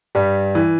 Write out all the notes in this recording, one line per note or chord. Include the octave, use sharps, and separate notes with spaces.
G2 G3
E3